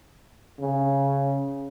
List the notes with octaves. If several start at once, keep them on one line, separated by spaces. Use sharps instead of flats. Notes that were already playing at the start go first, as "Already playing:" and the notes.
C#3